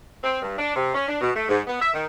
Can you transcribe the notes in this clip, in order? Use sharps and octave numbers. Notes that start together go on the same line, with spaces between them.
C4
G2
D4
C3
C#4
D4
B2
A3
G#2
B3
E5
D#3